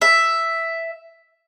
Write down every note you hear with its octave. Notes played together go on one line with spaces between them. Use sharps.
E5